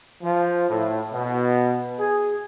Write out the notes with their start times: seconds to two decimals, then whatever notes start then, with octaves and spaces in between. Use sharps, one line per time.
0.22 F3
0.70 A2
1.12 B2
1.99 G#4